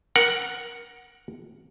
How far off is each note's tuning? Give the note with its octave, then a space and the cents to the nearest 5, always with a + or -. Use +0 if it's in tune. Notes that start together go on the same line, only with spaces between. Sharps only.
A#4 +20 F#5 +0